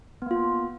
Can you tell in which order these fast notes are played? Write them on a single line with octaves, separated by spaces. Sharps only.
B3 A#3 F4